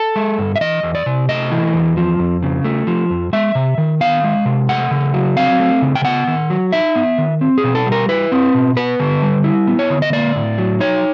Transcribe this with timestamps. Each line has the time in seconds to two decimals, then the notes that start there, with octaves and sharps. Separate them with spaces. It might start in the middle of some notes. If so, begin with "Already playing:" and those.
Already playing: A4
0.16 G#3
0.38 G2
0.56 E5
0.61 E3 D#5
0.83 E2
0.95 D5
1.06 C3
1.29 A3 D#5
1.51 E3
1.74 E2
1.97 F3
2.19 F2
2.43 C#3
2.65 A3
2.87 F3
3.10 F2
3.33 G#3 E5
3.55 C3
3.78 D#3
4.01 B3 F5
4.24 G#3
4.46 C3
4.69 A3 F#5
4.91 C#3
5.14 F#3
5.37 C4 F5
5.60 A3
5.82 C#3
5.95 G5
6.05 B3 F#5
6.27 D#3
6.50 F#3
6.73 D#4 E5
6.96 B3
7.18 D#3
7.41 C4
7.58 G#4
7.64 B2
7.75 A4
7.86 G3
7.92 A#4
8.09 E4 B4
8.32 C4
8.54 B2
8.77 B3 B4
9.00 D3
9.22 G3
9.44 E4
9.67 B3
9.79 C#5
9.90 D3
10.02 D#5
10.13 A#3 D5
10.36 A2
10.58 F#3
10.80 D#4 C#5